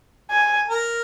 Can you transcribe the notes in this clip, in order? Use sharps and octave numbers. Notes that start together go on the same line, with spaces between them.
G#5
A#4